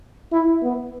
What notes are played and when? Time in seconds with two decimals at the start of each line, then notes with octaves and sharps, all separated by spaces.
0.32 E4
0.63 B3